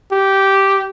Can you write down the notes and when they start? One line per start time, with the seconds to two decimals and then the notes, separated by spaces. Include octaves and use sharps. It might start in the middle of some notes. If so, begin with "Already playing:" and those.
0.12 G4